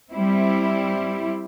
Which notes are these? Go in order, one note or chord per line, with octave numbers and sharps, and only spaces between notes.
G3 C4 E4